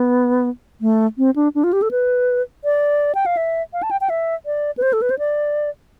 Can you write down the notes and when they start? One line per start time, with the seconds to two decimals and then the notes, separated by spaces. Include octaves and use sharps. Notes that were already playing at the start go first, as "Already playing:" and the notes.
Already playing: B3
0.81 A3
1.18 C4
1.36 D4
1.55 D4
1.64 F4
1.73 G4
1.82 A4
1.91 B4
2.64 D5
3.15 G5
3.26 F5
3.37 E5
3.73 F5
3.83 A5
3.91 G5
4.01 G5
4.10 E5
4.46 D5
4.78 B4
4.82 C5
4.93 A4
5.02 B4
5.10 C5
5.19 D5